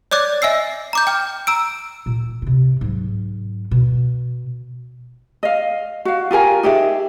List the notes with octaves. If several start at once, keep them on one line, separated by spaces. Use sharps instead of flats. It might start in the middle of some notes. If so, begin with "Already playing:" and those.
C#5 D5 D6 F#6 A6
D#5 E5 G#5 E6 C7
A#5 D6 G6
G5 D6 F6
A#5 E6 D7
A#2
C3 D#4
G#2 F#3
B2
D#5 F5
F#4 F5
F4 G4 A#4 G#5
D#4 G4 G#4 E5